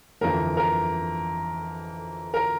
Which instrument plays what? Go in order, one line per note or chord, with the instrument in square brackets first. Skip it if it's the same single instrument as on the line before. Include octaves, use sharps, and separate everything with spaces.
[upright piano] G1 F2 E3 A#4
A#4
A#4